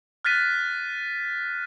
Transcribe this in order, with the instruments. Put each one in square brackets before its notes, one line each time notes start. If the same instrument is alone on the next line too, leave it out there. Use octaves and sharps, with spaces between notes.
[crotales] F6 F#6 A6 B6 D#7